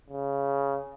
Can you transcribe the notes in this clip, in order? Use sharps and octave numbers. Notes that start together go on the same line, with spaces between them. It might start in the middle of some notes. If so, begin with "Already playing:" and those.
C#3